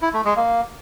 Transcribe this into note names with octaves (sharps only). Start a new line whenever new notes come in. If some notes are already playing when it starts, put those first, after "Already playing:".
E4
A3
G#3
A#3